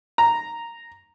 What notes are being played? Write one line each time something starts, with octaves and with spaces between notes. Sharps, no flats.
A#5